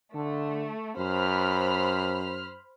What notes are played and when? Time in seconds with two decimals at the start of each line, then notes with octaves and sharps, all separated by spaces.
0.14 D3 A3
0.98 F#2 C5 B5 F6